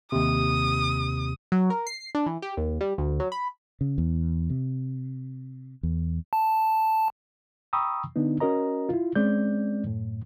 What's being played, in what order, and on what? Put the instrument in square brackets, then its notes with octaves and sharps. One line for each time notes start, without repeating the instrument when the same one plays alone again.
[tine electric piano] D#2 C3 [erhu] D#6
[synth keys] F#3
A#4
C7
D4
E3
G4
D#2
G3
D2
F#3
B5
[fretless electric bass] C#3
E2
C3
E2
[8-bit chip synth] A5
[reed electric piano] G5 A#5 B5 C#6 D#6 E6
D3 B3 D4 D#4
C#4 F#4 A#4 D#5 A#5
E4 F4
G#3 C4 C#4 D5 G6
F#2 A2